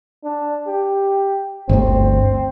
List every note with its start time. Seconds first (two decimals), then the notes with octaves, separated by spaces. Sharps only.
0.24 D4
0.67 G4
1.69 G1 D2 C4